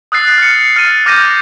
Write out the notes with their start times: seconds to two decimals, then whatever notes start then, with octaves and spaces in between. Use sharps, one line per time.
0.12 D#6 E6 F#6 A6 C7
0.38 F6 C#7
0.76 F6 A6 C7 D#7
1.06 D6 F6 G6 A#6 D#7